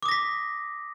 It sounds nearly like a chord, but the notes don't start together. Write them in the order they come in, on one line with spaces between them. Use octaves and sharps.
D6 D#6 A#6 B6